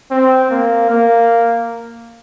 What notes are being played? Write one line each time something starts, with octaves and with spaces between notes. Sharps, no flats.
C4
A#3
A#3